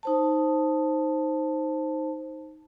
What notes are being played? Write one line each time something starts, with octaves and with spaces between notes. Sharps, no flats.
D#4 C5 A5